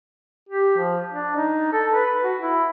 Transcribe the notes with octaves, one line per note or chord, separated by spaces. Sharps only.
G4
F3
D4
D#4
A4
B4
F#4
E4